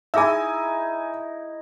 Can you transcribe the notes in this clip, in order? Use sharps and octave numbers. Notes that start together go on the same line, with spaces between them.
D#4 E4 G#4 E5 G#5 E6